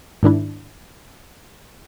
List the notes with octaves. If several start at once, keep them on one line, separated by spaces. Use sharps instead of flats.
G#2 D#3 D4 E4